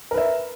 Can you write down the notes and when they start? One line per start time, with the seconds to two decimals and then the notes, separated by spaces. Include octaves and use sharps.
0.11 A#4
0.14 B4
0.17 E5